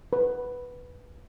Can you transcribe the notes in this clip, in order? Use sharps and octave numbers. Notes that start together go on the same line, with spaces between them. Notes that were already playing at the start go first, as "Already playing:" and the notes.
B4